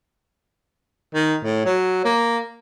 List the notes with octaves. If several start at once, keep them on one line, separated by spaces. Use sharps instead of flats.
D#3
A2
F#3
A#3